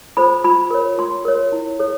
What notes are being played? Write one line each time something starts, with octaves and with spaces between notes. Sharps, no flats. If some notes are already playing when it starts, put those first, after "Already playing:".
F4 A4 C5 B5
F4 B5
A#4 C#5
F4 C6
A#4 C#5
E4
A4 C#5